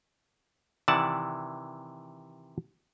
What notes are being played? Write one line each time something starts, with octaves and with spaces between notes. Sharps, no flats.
C3 D#3 E3 D5 F#5 A5